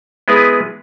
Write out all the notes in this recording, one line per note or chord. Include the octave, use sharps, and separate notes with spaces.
G#3 B3 E4 G#4 B4